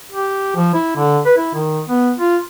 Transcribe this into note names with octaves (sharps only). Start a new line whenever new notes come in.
G4
F3
E4
D3
B4
E4
D#3
B3
F4